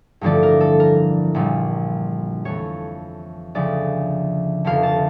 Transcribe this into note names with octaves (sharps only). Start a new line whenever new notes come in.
A1 G2 D3 F3 A3 D5
A#4
A4
A#4
A#1 A#2 G3
F2 E3 A3 C#5
D2 C#3 F3 D5
F1 F2 D3 F3 F5
A5